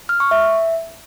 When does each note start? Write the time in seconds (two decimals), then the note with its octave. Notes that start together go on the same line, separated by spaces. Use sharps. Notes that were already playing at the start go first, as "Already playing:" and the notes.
0.09 F6
0.20 C#6
0.31 E5